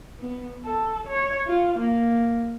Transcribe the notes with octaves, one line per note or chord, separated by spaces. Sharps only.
B3
A4
C#5
F4
A#3